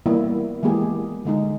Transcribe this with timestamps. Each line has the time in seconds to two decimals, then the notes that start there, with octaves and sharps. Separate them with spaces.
0.06 E3 G3 A#3 B3 E4
0.63 E3 G#3 A#3 B3 G4 G#4
1.25 D3 G#3 D#4